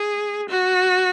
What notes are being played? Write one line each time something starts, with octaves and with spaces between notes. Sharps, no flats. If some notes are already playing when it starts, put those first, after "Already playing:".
Already playing: G#4
F#4